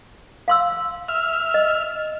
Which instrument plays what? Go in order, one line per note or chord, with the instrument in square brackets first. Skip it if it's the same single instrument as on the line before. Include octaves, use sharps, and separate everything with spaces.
[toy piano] F5 C6 E6
[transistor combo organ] E5 F6
[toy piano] D#5